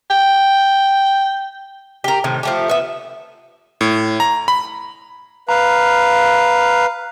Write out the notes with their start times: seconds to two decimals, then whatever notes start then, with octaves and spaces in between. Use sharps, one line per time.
0.10 G5
2.04 G4 A#4
2.24 A2 C3 D#3
2.43 F3 A3 G4
2.69 B3 E5
3.81 A2
4.20 A#5
4.48 B5
5.49 B4 F5 A#5